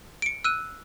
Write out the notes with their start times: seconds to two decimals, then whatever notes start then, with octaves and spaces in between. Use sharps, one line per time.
0.22 C#7 D7
0.44 E6 F#6 D#7